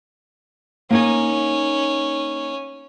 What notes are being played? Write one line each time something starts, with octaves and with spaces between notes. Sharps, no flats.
A#3 C#4 D#4 G#5